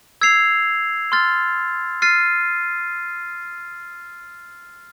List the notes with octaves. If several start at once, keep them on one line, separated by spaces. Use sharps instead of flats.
E6 G#6 C7 F7
C6 F6 A6
F6 A6 C7 D#7